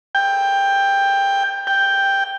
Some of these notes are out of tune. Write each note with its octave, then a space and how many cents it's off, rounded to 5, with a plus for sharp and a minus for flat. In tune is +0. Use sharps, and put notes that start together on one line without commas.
G5 +15
G5 +5